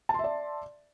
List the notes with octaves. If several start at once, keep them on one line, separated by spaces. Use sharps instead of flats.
D5 E5 A5 C6